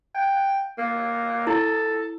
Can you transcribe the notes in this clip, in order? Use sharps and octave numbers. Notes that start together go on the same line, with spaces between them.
G5
A#3
E4 A4